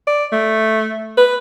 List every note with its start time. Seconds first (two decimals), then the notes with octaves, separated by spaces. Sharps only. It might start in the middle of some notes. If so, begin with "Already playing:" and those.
0.07 D5
0.32 A3
1.17 B4